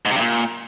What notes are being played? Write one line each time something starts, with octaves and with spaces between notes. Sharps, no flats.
G#2
C3
G2
A#2